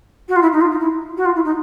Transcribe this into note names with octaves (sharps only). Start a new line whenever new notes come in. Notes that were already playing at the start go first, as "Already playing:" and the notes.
F#4
F4
E4
D#4
F4
D#4
E4
F#4
F4
E4
D#4